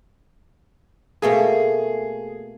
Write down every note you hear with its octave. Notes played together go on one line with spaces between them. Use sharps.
B2 A3 A#3 G#4